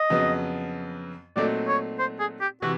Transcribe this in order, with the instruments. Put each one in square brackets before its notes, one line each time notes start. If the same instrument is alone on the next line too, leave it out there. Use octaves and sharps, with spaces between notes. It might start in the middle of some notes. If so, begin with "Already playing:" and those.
Already playing: [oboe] D#5
[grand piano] F2 C#3 F#3 B3
[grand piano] A#2 F#3 A3 C4 D#4 [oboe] D5
[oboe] C#5
C5
G#4
G4
[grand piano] C3 E3 [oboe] F#4